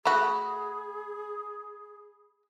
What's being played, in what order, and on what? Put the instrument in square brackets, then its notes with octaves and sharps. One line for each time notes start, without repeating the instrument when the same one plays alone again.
[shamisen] A3 F#4 [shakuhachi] G#4 [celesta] B5